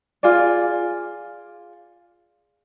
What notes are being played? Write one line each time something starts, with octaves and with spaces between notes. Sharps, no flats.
F4 G#4 D5